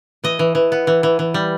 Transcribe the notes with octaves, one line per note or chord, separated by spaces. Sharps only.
E3 D#5
E3
E3
B3
E3
E3
E3
G3